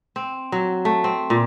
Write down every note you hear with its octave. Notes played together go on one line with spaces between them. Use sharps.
C4
F#3
A3
C4
A#2